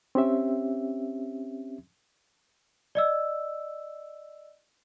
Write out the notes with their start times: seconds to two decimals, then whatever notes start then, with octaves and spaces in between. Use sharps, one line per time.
0.15 C4 C#4 G4 E5
2.95 D5 D#5 E6